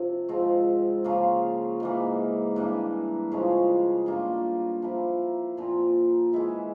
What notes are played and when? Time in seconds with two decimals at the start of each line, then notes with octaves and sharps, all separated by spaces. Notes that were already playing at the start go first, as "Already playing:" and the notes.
Already playing: C3 F3 C4
0.29 G#2 F3 C4
1.04 C#3 F3 A#3 F4
1.80 G#2 E3 A#3
2.56 G2 E3 A#3
3.32 C#3 F3 G#3
4.06 G2 G3 A#3 F4
4.82 F3 A#3 E4
5.57 A#2 F3 C4 F4
6.33 E3 G#3 E4